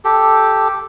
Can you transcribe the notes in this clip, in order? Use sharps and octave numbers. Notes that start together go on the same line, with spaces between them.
G4 A4